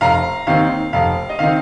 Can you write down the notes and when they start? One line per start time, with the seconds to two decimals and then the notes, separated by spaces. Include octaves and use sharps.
0.01 F1 F5 A#5
0.47 D#2 D#3 C4 D#4 F5
0.93 F1 F5
1.29 D#5
1.39 D#3 C4 D#4 F5